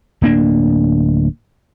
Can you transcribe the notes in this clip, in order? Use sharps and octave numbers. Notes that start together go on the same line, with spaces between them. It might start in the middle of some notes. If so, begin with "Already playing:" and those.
D1 A#3 D4